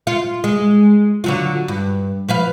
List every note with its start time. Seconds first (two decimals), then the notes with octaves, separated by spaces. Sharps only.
0.07 F4
0.44 G#3
1.24 D3 F#3 F4
1.68 G2
2.28 F3 B4 F5